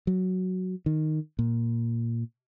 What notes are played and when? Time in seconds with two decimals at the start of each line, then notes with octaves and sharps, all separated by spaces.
0.07 F#3
0.86 D#3
1.39 A#2